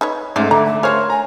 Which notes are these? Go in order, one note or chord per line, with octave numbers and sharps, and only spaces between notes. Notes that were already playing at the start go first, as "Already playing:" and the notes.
D#4 B4 C#5
G#2 A3 C#4 C5 D5 E5
D3 A#5 D6
E5
G#4 A#4 C5 C#5 F5 C6 F6
G#5 A#5